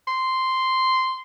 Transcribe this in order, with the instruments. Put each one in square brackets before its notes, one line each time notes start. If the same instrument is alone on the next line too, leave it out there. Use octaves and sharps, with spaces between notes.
[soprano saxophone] C6